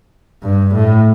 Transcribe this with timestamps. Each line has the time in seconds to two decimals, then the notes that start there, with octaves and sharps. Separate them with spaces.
0.42 G2
0.74 A2